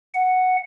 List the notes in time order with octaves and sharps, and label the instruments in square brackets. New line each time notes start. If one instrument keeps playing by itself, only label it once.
[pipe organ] F#5